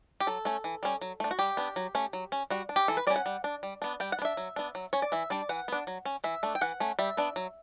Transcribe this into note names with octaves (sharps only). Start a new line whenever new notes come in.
G4
F#3 A4
A3 C#4
E3
G3 C#4
F#3
A3 D4
F#4
G3 G4
B3 D4
F#3
A3 C#4
F#3
C#4
G3 F#4
D4
G4
E3 A4
B4
G3 C#4 D5
F#5
G3
D4
G3
B3 D4
G3 G5
F#5
B3
D4 E5
F#3
B3 D4
F#3
C#4 C#5
D5
E3 E5
G3 D4 D5
E3 F#5
B3 D4
F#3
C#4
E3 E5
A3 D4
G5
E3 F#5
A3 C#4
G3 E5
B3 D4
F#3